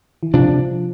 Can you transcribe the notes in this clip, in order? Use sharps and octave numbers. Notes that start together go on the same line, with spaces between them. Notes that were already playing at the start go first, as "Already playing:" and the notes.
E3
C3 F3 G3 D4